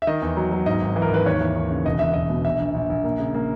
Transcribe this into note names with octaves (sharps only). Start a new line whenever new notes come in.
E5
D#3 D#5
E2
F#3
F#3
G#2 D#5
G#1
E3
A#4
G#1 B4
D#2 C#5
E3
D#2
C#3
E1 D#5
E1 E5
E1 D#5
B2
A#1 E5
A#1
A#1
A#1
A#3
C#3
A#3